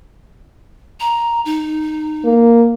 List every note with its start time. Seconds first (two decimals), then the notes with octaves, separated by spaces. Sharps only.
1.00 A#5
1.45 D#4
2.25 A#3